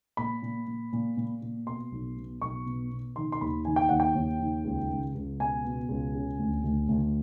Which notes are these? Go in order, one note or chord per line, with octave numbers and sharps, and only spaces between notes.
A#2 B5
A#2
A#2
A#2
A#2
A#2
B2 C6
B1
B2
B1 C#6
B2
B2
D#3 C6
C6
D#2 B5
D#3 G#5
G5
D#2 F#5
G5
D#2
D#3
C#2
C#2
C#2
B2 G#5
B2
C#2
C#3
D2
D2
D2